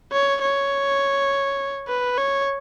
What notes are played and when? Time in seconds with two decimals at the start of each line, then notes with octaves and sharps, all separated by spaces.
0.12 C#5
0.42 C#5
1.88 B4
2.18 C#5